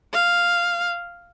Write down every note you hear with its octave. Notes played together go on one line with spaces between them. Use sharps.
F5